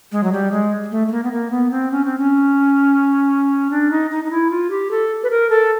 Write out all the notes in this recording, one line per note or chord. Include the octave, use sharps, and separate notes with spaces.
G#3
F#3
G3
G#3
A3
A3
A#3
B3
A#3
B3
C4
C#4
C4
C#4
D4
D#4
D#4
D#4
E4
F4
G4
A4
B4
A#4
A4